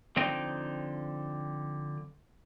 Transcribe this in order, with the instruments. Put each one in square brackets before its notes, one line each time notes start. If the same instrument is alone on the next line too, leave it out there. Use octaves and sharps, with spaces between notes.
[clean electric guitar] D3 F3 C4 D#4 D#5 G5